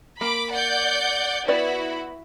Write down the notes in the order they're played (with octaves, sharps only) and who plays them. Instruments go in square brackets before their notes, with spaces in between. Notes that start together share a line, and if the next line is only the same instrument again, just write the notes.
[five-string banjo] A#3 [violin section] B5 D6
[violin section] D5 F#5 G6
[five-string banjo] B3 B4 D5 [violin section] E4 F#4 B5